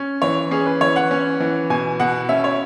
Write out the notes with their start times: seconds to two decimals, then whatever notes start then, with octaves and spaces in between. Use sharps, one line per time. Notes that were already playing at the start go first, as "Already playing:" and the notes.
Already playing: C#4
0.22 E3 C#5
0.51 C#4 G#4
0.66 B4
0.81 E3 C#5
0.96 F#5
1.11 C#4
1.40 E3
1.70 B2 G#5
2.00 B2 F#5
2.29 C#4 E5
2.44 C#5